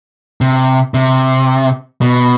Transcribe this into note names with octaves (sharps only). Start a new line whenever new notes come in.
C3
C3
B2